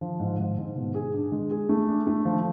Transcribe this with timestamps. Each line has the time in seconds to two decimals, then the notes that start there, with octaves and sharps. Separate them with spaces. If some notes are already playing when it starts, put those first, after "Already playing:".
0.01 F3
0.19 G#2
0.39 G#2
0.58 G#2
0.76 B2
0.94 G#4
1.14 D4
1.32 G#3
1.51 G#4
1.69 A3
1.88 D4
2.07 A3
2.25 F3